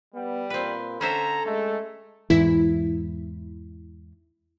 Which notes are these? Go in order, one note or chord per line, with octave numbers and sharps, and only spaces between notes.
G3 B3
A#2 C4 B4
D3 C#4 A4 C5 E5 A#5
G#3 A3
E2 G#2 E3 E4 B6